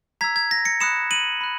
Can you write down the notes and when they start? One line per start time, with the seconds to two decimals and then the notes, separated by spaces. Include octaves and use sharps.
0.21 A#5 E6 G#6 B6
0.36 G#6
0.51 A#6
0.65 A#6 C#7
0.80 B5 D#6 F#6 C#7 E7
1.11 D#7 F#7
1.41 B5 F#6